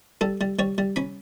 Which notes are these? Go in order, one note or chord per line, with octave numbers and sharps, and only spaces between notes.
G3 A4
G3
G3 C#5
G3
C#4 B5